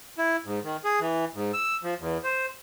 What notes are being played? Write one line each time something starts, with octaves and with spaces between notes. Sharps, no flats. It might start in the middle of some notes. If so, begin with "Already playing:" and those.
E4
G#2
D#3
G#4
E3
G#2
E6
F3
E2
C5